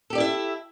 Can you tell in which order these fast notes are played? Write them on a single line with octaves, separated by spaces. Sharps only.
A4 G4 D5 E4 E5